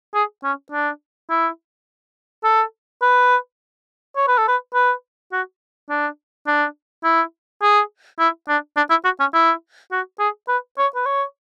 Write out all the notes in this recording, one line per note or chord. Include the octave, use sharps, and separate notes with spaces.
G#4
C#4
D4
E4
A4
B4
C#5
B4
A4
B4
B4
F#4
D4
D4
E4
G#4
E4
D4
D4
E4
F#4
C#4
E4
F#4
G#4
B4
C#5
B4
C#5